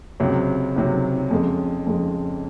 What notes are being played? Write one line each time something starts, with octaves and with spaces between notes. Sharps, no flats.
C#2 C3 F#3
C#2 C3 F#3
F2 C#3 G#3
F2 C#3 G#3